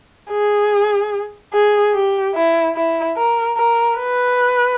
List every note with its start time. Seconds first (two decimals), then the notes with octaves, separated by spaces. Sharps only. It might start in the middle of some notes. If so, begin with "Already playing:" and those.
0.31 G#4
1.53 G#4
1.94 G4
2.35 E4
2.76 E4
3.17 A#4
3.57 A#4
3.98 B4